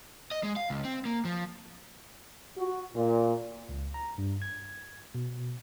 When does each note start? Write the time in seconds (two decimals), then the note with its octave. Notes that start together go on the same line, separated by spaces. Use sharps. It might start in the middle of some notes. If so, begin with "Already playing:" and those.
0.31 D#5
0.43 G#3
0.56 F5
0.70 C#2
0.85 C4
1.05 A#3
1.25 F3
2.58 F#4
2.94 A#2
3.69 C#2
3.94 A#5
4.18 G2
4.42 G#6
5.15 B2